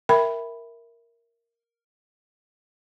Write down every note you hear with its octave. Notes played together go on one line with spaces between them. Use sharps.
A#4 E5 G5 B5